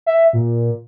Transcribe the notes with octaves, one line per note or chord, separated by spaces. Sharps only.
E5
A#2